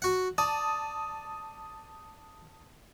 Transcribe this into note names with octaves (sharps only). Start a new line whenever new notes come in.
F#4 F#5
D5 A5 D#6